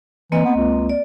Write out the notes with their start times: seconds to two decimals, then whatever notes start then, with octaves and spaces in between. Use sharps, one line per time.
0.32 E3 A#3 C4 D#5
0.45 B3
0.57 C#2
0.89 D5